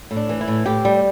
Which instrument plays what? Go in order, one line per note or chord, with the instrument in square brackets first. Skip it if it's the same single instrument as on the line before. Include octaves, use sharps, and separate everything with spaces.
[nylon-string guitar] A2
D4
E3
E4
A2
A2 G4
G3